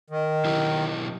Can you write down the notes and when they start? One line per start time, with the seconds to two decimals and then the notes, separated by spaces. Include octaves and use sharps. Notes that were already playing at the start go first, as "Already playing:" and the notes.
0.10 D#3
0.45 F#3 E4 G4